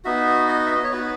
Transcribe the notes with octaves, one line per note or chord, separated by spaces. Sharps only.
B3 D#4 F#4 E5
D#5
E5
D#5
C#5
B3 D#4 F#4 B4